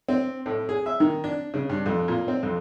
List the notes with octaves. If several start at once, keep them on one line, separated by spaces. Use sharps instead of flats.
C4
A2
G#4
E5
D#3
D4
C#3
G2
F2
A#2
C4
F2